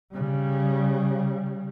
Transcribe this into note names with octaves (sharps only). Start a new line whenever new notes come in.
C#3 G3